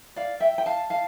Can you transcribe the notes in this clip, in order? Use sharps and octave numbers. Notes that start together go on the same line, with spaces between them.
D5 F5
E5 G5
G5
F5 A5
F5 A5